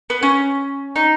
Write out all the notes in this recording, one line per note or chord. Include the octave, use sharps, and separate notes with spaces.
B3
C#4
D#4